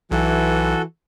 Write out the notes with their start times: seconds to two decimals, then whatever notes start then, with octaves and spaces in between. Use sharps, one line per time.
0.11 B1 E3 F#4 A4